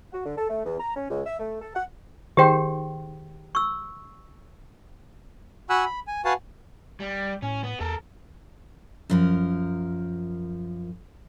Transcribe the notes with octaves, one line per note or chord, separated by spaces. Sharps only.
F#4
D3
A4
A3
E2
A#5
C#4
C#2
E5
A3
A4
F#5
D#3 G4 G#4 C5 G5
C#6 E6
F#4 F#5 G#5 B5 E6 F#6
B5
G#5
F#4 B4 F5 F#5 G#5 A5
G3
A2 C#4
B3
E2 A4 A#4
F#2 F3 A#4